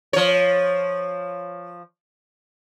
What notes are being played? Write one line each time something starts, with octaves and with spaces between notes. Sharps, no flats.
F3 C#5